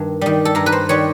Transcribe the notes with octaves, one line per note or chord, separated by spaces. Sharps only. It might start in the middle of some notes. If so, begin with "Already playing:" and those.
Already playing: G2 D#3
D#3 G3
A4
G2 A#4
B4
C5
D#3 G3 C#5